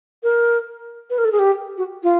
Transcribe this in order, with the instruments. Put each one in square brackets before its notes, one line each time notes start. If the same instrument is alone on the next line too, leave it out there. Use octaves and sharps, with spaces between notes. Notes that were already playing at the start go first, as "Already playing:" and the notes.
[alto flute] A#4
B4
A#4
A4
G#4
G4
F#4
F4